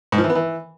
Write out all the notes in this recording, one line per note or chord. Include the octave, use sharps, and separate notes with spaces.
G#2
F3
E3
B3
E3